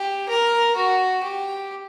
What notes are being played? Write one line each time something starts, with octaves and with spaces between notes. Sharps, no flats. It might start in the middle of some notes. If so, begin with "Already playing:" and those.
Already playing: G4
A#4
F#4
G4